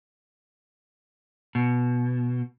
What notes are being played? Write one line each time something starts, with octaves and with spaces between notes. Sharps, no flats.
B2